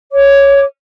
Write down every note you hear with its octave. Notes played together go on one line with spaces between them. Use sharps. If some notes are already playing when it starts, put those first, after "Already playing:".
C#5 D6